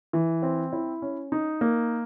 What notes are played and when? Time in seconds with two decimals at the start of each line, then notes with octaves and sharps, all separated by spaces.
0.13 E3
0.43 C4
0.73 E4
1.02 C#4
1.32 D#4
1.61 A#3